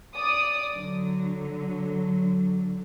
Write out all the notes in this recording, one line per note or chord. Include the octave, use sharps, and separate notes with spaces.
D5 D#6
D3 F#3